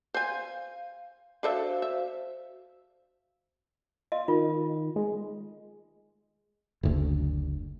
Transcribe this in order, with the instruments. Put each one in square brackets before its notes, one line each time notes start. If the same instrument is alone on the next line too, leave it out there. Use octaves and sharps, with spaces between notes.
[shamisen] C5 G#5 [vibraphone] F5
[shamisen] D4 A4 E5 [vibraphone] F#4 C5 F5
[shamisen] E5
[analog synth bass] F4 [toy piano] D#5
[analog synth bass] D#3 [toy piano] F4
[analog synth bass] G#3
[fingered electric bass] F#1 D2